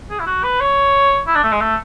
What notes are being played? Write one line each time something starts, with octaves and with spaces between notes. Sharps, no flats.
G#4
E4
F#4
B4
C#5
E4
D4
A3
G#3
A3